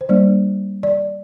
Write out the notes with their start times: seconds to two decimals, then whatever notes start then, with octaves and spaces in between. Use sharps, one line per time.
0.01 C5
0.09 G3 A#3 D4 D5
0.83 D5